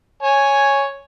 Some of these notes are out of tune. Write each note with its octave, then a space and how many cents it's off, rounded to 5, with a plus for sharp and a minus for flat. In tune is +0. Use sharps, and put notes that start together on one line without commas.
C#5 +0 G#5 +0